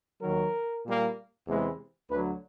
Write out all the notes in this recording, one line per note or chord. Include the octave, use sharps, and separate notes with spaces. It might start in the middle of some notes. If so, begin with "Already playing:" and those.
D#2 D#3 F#3 A#4
A#2 G3 A#3
E2 C3 E3 G#3
D2 D3 F#3 B4